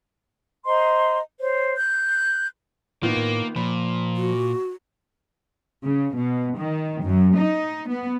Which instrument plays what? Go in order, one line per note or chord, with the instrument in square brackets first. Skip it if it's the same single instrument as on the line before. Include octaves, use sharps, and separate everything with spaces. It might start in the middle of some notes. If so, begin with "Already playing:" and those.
[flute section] C5 D#5 A#5 C6
C5 C#5
F#6 G6
[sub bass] A2 [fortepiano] D#3 B3 F4 [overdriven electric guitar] A#3
[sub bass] A2
[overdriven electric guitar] A#2 [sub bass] F3 [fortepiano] B5
[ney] F#4
[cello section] C#3
B2
D#3
F#2
D#4
B3